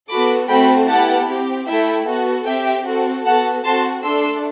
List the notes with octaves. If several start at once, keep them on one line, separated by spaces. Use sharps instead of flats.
B3 F#4 A4 B5 D6
A3 C4 F#4 A4 G5 B5
B3 E4 G4 F#5 A5
C4 G4
A3 E4 A4 E5 G5
B3 F#4 A4
C4 G4 E5 G5
C4 F#4 A4
B3 F#4 A4 F#5 A5
C4 F#4 A4 A5 C6
A3 D4 A4 C6 E6